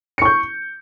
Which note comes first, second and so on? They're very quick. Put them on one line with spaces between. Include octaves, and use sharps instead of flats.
C#7 C#6 G6